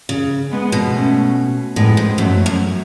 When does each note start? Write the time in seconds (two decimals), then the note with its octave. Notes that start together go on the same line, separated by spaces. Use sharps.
0.09 C#3
0.52 G#3 B3
0.72 B2
0.93 A3 C#4
1.76 A2 G#3 B3
1.97 G#2
2.18 F#2 F#3 A3
2.46 F#2